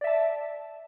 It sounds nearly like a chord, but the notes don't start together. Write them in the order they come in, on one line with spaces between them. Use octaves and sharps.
D5 E5 A5